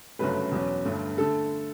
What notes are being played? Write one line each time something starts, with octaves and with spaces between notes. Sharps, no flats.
G1 F#2 C#3 F#3 A3 B4
E2 B2 F#3 C#4
G1 G2 D3 A3
D3 A3 A4